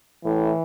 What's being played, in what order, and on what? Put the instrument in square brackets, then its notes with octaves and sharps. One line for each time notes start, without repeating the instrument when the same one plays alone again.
[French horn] A2 [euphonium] E3